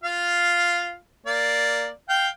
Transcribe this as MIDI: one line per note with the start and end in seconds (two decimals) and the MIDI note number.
0.03 0.97 65
0.03 0.97 77
1.26 1.88 58
1.26 1.88 74
2.09 2.28 77
2.09 2.28 79